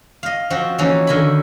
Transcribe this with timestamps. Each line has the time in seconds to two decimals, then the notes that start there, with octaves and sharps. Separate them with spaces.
0.23 D#5 F5
0.50 F3 C4 F#4
0.78 E3 A#3 C#4 D#4
1.07 D3 D#3 A#4 G#5 B5